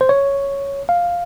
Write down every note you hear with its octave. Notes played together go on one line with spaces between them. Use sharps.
C5
C#5
F5